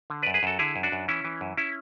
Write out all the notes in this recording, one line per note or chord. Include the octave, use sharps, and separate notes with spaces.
D3
F#2 B4 D5
G#4 B4
F#2 F#4 A4
D3 E4 G#4
F#2
D4 F#4
F#2
E3 C#4 E4
E3
F#2
C#4 E4